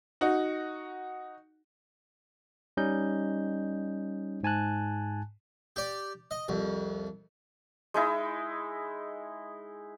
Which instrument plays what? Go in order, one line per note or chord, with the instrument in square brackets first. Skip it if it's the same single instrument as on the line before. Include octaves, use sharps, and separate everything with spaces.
[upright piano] D#4 F#4
[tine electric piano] G3 C#4 D#4 D#5 G6
G#2 G#5 A5 F#6
[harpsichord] G4 D5
D#5
C2 F2
[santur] G#3 D#4 E4